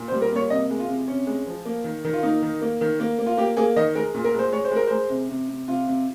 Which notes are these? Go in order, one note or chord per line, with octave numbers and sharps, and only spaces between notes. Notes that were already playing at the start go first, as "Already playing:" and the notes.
Already playing: A#2
C5
G3
A#4
A#3 C#5
C3 D#5
G#3
F4
C3
C3 C#4
G#3
F3
A#3
D#3
D#3
F4
A#3 D#4
D#3
A#3
D#3
A#3
A#3
F4
A#3 G4
A#3 G#4
D#3 D#5
G#3 A#4
A#2
A#4
G#3 C5
G#3 C#5
C5
G#3 A#4
G#3 C5
C3
C3
C3
C3 F4
C3